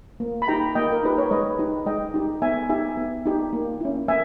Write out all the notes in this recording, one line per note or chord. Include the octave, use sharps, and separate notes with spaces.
A#3
B5
D#4 G4 G5 A#5
A#3 D#5 G5
A#4
D#4 G4 B4
C#5
G#3 B4 D#5
D#4 G4
G#3 D#5 G5
D#4 G4
B3 E5 G#5
D#4 G4 E5 G#5
B3
D#4 G4
A#3
C#4 E4
A#3 E5 G#5